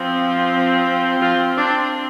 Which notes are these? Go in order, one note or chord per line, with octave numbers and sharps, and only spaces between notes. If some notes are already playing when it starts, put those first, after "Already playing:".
Already playing: F3 C4
F3 F4
D4